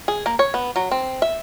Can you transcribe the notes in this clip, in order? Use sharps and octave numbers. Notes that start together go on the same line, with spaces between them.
G#4
A#3
C#5
B3
F#3
C4
E5